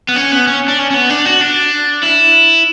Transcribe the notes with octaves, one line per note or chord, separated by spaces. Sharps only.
B3
C#4
B3
C#4
D4
C#4
C#4
B3
D4
F#4
D4
E4